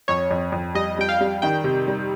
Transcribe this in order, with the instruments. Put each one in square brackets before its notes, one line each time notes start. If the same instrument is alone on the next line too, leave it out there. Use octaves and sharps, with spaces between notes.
[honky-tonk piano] F2 [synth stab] C#5
[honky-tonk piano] F2
F2
[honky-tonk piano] G3 [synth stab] D#5
[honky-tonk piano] G3 [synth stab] G5
[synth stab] F5
[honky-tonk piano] G3
[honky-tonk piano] D#3 [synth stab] G5
[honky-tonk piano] C3
G3